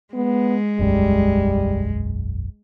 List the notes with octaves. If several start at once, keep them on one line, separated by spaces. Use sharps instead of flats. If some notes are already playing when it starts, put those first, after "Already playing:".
G#3 B3
E1 B1 F#2 G3